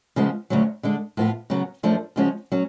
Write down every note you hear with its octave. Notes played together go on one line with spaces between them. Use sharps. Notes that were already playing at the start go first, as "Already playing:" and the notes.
C#3 F3 G#3 B3
D2 C#3 F#3 C#4
D3 G#3 D4
A2 F3 B3 F4
C#3 F#3 B3
F#2 F3 A3 D4
C#3 F3 G#3 C#4 F#4
F#3 C#4